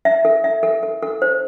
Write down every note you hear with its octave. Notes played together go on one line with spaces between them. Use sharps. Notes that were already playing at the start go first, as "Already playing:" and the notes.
E5
A4
E5
A4
A4
A4
C5